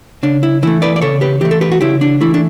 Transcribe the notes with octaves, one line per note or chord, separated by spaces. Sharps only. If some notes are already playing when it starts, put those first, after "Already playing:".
C#3 D4
E4
E3 A3 E4
B4 D5
D5
C#3 A4 C#5
G4 B4
E3 A3 G4
A4
G4 B4
F#4
C#3 E4 G4
D4
E3 A3 E4
D4